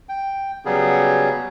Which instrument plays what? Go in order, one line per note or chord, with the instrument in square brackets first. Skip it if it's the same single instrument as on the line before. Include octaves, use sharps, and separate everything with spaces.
[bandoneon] G5
C#3 F#3 G3 B3 G#4